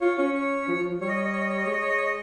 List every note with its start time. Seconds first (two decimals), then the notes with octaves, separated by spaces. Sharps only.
0.01 F4 C#5
0.18 C#4 C#5
0.34 C#5
0.68 F3
0.79 F3
0.90 F3
1.01 G3 C#5
1.08 D#5
1.16 C#5
1.25 D#5
1.33 C#5
1.41 D#5
1.49 C#5
1.57 D#5
1.65 G#3 C#5
1.73 D#5
1.81 C#5
1.89 D#5
1.97 C#5
2.05 D#5